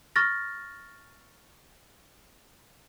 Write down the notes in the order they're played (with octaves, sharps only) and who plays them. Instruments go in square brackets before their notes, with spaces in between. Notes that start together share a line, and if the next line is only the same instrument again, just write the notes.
[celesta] C#6 F6 A6 A#6